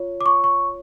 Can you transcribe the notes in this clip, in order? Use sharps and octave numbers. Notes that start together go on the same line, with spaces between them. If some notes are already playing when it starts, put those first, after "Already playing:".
Already playing: F4 C#5
D6
C#6
C#6